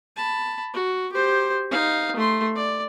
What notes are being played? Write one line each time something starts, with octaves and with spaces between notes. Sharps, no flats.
A5 B5
F#4
G4 C5
D#4 F5
A3 C6
D5